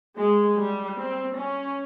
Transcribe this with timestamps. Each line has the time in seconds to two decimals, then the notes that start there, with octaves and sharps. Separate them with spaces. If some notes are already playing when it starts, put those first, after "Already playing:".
0.17 G#3
0.57 G3
0.97 C4
1.35 C#4